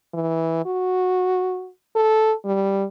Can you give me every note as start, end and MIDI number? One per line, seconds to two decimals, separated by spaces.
0.14 0.65 52
0.66 1.69 66
1.95 2.33 69
2.45 2.84 55